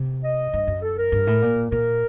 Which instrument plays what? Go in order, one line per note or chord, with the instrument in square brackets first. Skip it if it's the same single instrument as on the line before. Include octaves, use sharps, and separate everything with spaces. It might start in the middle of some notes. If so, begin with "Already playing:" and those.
Already playing: [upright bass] C3
[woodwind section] D#5
[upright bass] G2
F#2
[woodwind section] A4
A#4
[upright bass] G2
A2
A#2
[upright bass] A#2 [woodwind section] A#4